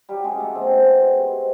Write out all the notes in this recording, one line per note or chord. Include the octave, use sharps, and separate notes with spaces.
F#3 G3 G4
C#3 G#3 G#4
F#3 A3 A4
B2 C4 C5
G#3
B2
G#3
C3
C3